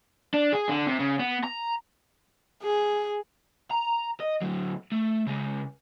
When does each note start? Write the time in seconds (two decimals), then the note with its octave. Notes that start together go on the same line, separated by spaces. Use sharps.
0.34 D4
0.53 G#4
0.69 D3
0.87 C3
0.99 C#3
1.19 B3
1.43 A#5
2.63 G#4
3.71 A#5
4.20 D#5
4.42 D2 F#3
4.92 A3
5.27 C#3 G#3